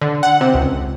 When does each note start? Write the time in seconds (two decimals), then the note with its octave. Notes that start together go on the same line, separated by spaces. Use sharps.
0.01 D3
0.23 F#5
0.41 C3
0.54 C#2